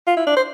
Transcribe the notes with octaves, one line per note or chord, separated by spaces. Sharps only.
F4
E4
D4
C5